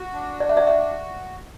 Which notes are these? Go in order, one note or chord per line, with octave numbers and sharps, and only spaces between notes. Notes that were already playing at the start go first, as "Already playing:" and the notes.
Already playing: F#4
D4
D5
E5
F#4 D5
E5